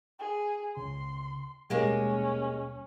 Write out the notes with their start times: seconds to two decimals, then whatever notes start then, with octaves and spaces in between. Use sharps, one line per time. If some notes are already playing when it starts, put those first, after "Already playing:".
0.20 G#4
0.77 C#2 C#3 C6
1.70 D#1 B2 G3 G#3 A#3 C#4 G4